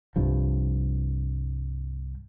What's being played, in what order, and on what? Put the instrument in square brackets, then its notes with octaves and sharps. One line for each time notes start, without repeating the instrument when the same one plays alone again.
[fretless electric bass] C2 G2 F3